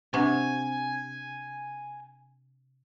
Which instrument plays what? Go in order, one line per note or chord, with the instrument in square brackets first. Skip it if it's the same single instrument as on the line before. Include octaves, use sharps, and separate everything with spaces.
[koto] C3 [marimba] D4 F#5 C#6 [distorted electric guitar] G#5